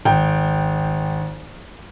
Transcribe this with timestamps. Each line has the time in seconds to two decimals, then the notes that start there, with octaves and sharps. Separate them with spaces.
0.05 G#1 G5